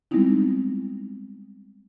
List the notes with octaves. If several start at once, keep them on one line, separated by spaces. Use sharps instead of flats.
G3 G#3 B3 C4 D#4 E4